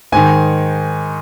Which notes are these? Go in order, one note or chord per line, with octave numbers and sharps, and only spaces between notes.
G#2 D#3 G#5